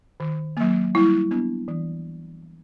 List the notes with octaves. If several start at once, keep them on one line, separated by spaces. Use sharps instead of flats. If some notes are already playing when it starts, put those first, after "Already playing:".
D#3
F#3 A#3
G3 E4
B3 D4
E3